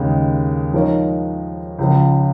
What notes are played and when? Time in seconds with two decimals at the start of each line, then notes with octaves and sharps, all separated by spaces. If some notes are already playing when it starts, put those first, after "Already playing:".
Already playing: D#2 C#3 G#3
0.73 F3 G#3 D#4 A#4 C#5
1.79 C#2 C#3 F3